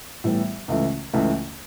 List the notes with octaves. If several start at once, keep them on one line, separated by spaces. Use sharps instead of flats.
A2 E3 G3 B3
C#2 C#3 E3 A3
C#2 C#3 E3 A3